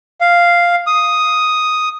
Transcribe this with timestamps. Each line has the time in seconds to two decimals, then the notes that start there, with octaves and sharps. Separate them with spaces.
0.21 F5
0.87 D#6